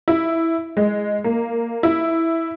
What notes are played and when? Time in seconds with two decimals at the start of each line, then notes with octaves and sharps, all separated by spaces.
0.08 E4
0.77 G#3
1.24 A#3
1.83 E4